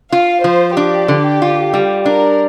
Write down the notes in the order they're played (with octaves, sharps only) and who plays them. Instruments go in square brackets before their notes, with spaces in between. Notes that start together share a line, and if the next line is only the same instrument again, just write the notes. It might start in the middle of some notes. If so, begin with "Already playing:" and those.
[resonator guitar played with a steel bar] F4 [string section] F5
[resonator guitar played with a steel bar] F3 [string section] C5
[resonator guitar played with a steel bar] D4 [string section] G4
[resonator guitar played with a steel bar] D3
F4
G3
[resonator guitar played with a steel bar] D4 [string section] A#4